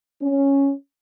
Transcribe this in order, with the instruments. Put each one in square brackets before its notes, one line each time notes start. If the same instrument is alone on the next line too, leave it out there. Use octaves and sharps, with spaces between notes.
[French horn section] C#4